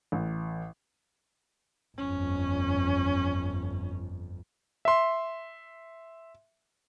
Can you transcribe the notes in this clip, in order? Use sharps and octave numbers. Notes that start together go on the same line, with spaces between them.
A1
G1 F2 C#4
E5 C6